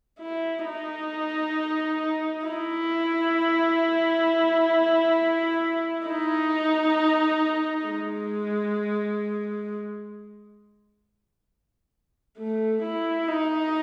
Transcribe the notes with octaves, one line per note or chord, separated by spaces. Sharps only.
E4
D#4
E4
D#4
G#3
A3
E4
D#4